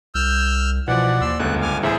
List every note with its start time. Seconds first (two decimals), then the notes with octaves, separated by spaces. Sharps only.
0.15 C2 E6 F6 G6
0.88 B2 E3 F3 D5 F#5
1.21 D#2 D5 C6 E6
1.39 G1 C#2 A4 F#6
1.62 G#5 D6 F6
1.83 E2 A2 G#4 C5 E5